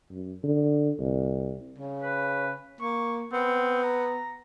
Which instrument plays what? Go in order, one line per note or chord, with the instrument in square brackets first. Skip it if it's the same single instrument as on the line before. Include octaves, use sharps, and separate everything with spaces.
[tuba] F#2
D3
C2
[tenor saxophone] C#3
[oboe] B4
[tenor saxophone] A#3 [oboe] C#6
[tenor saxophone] B3 [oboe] C4
[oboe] A#5